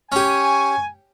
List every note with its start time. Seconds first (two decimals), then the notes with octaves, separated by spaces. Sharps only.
0.12 C#4 G4 G#5 C#6